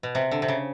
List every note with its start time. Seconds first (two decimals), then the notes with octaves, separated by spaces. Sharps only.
0.03 B2
0.15 C3
0.31 D3
0.42 C3
0.48 C#3